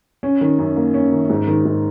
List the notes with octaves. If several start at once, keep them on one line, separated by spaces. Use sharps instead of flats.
C#4
D#3
F#2
A#3
C#4
D#3
G#2
D#3
G#2